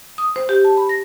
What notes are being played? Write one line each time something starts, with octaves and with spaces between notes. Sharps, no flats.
D#6
C5
G4
A5
B5
A#6